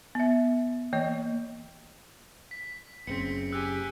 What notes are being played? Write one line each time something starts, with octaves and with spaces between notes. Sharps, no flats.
B3 E5
E3 A#3 C#5 D#5
B6
F#1 C#3 C4 B6 C#7
G4 G#5 E6 F#6